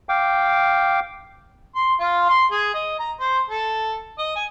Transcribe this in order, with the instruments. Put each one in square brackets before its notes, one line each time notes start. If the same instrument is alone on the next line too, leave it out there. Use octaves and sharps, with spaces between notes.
[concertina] F5 G5 D6
[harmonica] C6
F4
C6
G#4
D#5
A#5
C5
A4
D#5
G#5